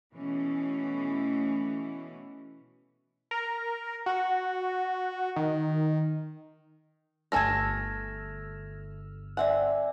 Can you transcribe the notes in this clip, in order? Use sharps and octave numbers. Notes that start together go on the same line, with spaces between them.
B2 E3 A3 C#4
A#4
F#4
D#3
G1 A3 A4 G#5 E6 F6 G#6 A#6
C4 D5 E5 F#5 G#5